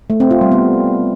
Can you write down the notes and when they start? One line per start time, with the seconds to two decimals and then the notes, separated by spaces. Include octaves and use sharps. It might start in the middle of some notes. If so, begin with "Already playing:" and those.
0.10 A3
0.20 C4
0.31 F4
0.41 G3
0.52 B3